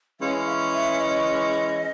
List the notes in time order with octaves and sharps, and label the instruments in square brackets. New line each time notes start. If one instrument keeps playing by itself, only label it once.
[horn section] E3 G#3 C#4 [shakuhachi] F5
[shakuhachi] E5
E5
D#5